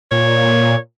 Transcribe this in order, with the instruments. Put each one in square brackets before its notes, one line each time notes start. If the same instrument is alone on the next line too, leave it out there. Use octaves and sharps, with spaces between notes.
[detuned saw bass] A#2 [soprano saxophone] C#5